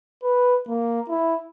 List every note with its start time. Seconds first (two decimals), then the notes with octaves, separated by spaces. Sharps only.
0.23 B4
0.68 A#3
1.09 E4